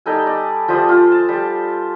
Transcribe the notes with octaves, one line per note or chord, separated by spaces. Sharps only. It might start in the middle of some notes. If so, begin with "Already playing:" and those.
G3 D#4 A4 G#5
D5
F3 G3 C5 D#6
F4
A5
G3